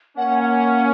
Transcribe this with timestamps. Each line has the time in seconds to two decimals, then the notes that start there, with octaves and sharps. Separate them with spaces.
0.17 A#3 C#4 F#5
0.43 F#5